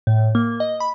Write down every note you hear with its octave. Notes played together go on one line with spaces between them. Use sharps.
A2
A#3
D#5
B5